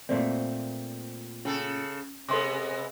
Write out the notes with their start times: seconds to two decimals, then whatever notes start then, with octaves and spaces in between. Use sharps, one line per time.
0.09 A#2 A3 C4 D5
1.45 C#3 C#4 A4
2.29 C3 G#3 B3 A4 C6 D6